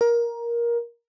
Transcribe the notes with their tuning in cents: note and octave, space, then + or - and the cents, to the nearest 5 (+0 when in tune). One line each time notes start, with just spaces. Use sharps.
A#4 +15